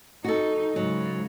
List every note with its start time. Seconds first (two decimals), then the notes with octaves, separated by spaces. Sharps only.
0.24 D#4 F#4 A4
0.76 G#2 C#3 F#3